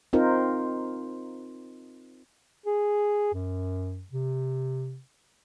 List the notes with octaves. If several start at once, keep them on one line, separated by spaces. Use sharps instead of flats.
C4 D#4 F4 A#4 C5
G#4
F#2
C3